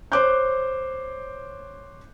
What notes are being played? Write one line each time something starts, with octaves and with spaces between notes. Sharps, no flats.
C5 C#5 D6 F#6 G6